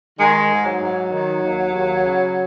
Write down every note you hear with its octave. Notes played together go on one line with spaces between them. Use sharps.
D#3 G#3
G#2
F#3
G#2
D#3
D#2
D#2
C#3